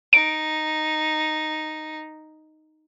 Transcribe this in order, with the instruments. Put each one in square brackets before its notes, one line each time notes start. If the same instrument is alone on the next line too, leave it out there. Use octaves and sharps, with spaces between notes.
[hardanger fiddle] D#4 [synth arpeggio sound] D7